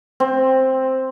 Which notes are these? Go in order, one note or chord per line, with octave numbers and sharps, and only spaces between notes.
C4